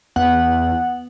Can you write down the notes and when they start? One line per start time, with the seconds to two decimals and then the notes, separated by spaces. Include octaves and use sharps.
0.16 E2 B3 F#5